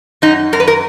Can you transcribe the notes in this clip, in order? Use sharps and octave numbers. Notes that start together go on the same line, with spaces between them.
F#2 D#4
F#2 A#4
B4
A#4